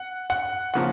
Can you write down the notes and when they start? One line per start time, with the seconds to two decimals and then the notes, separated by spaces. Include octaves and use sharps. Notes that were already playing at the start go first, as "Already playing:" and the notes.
Already playing: F#5
0.30 F#5
0.74 C#3 F3 A#3 F#5